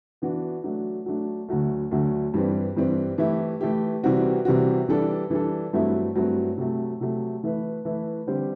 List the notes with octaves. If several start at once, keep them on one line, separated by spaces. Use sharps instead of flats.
E3 B3 D4 F#4
F#3 A3 D4
F#3 A3 D4
D2 D3 F#3 A3
D2 D3 F#3 A3
G2 E3 G3 C4
G2 E3 G3 C4
E3 A3 E4 G4
E3 A3 E4 G4
C3 E3 G3 C4 F#4
C3 E3 G3 C4 F#4
E3 G3 D4 A4
E3 G3 D4 A4
G2 F#3 A3 C4 E4
G2 F#3 A3 C4 E4
C3 F#3 A3
C3 F#3 A3
E3 A3 E4 B4
E3 A3 E4 B4
D3 G3 C4 G4 C5